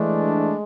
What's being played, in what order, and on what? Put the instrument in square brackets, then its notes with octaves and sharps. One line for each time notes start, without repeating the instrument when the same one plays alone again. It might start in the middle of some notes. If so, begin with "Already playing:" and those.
Already playing: [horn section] E3 A3 D4 [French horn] G#3